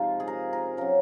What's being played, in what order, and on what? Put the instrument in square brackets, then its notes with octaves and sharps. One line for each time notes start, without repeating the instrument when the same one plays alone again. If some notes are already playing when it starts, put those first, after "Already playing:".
Already playing: [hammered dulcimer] C3 F3 G#3 D#4 F4
G#4
A#4
A#4
C#3 F#3 A#4